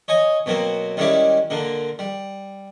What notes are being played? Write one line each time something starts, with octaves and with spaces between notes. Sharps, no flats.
C#5 D#5 G#5
B2 F#3 A#3 C4
D#3 G3 G#3 C#4 E4 G4
A#2 D3 A#3
G3